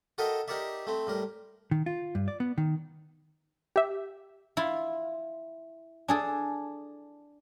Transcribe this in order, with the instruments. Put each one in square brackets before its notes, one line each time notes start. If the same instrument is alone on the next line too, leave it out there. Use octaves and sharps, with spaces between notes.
[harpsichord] F#4 A4 A#4 D#5 E5 G5
D#4 G4 A#4 C#5 D5 E5
A3 C4 E4
A2 G3 A#4
[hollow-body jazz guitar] D#3
F4
G2
D5
B3
D#3
[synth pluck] G4 E5
[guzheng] E4 F4
D4 G#4 A4